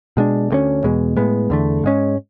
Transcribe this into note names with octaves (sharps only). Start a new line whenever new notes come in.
B2 G#3 D4
D2 D3 G#3 C#4
E2 B2 G#3
A2 G#3 B3
E2 D3 A3
G#2 G#3 C#4